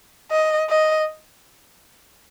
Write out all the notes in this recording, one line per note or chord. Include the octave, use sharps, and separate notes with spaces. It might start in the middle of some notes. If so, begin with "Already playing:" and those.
D#5
D#5